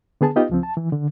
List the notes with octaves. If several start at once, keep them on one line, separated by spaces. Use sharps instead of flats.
D3 B3 G#4 A5
B3 D#4 F4 G4 D#5
C#2 F3 C4
A5
E3
D3